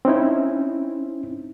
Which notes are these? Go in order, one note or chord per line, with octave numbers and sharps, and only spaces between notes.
C4 C#4 D#4 E4